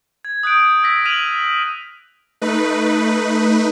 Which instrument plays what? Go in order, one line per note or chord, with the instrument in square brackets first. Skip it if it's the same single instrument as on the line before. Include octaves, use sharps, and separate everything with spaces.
[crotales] G#6
D#6 F#6 G6 D7
E6 A#6 B6
F6 B6 D#7 F7 F#7
[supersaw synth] A3 D#4 B4